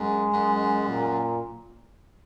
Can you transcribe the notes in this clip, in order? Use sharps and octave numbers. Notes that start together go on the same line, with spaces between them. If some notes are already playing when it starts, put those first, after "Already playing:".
Already playing: F#2 G#3
F#2
A#2